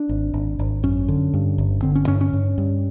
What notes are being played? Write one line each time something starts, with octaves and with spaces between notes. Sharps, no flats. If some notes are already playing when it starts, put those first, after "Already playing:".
Already playing: D4
G#1
G#1
G#1
F#2 C#4
D3
G2
G1
D3 C4
C#4
G2 C#4
C#4
G2
G2